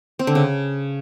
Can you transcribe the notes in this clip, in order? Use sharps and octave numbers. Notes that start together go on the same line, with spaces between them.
C4
D3
C#3